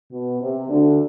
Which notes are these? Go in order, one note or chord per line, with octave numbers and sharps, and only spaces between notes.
B2
C3
D2 D3